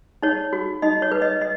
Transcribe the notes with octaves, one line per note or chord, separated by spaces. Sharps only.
D#4 C#5
F#4
D#4 D#5
C#5
B4
D#5
D#5